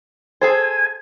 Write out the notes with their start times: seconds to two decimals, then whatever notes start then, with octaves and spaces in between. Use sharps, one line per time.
0.41 G#4 A4 C5 G#5